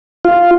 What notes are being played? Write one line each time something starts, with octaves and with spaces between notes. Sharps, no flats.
F4